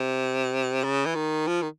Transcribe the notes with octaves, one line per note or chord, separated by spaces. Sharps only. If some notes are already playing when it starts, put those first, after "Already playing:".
Already playing: C3
C#3
E3
D#3
F3
D#3